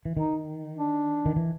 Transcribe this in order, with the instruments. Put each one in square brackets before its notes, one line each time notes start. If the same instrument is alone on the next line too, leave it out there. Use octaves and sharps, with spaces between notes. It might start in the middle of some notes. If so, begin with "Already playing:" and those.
[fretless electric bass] E3
[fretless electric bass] D#3 [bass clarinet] D#4
[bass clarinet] D4
[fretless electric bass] D#3
E3